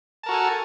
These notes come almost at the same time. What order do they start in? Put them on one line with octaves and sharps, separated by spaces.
A5 A#4 F#4 A4 G#5